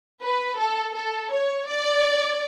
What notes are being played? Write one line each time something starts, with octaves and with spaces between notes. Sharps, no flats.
B4
A4
A4
C#5
D5